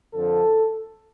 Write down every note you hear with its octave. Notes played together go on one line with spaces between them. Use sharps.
F2 D3 F3 A4